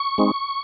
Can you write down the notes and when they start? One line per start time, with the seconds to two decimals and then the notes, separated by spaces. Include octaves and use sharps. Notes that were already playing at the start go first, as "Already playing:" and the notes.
Already playing: C#6
0.18 G#3 C4 D#4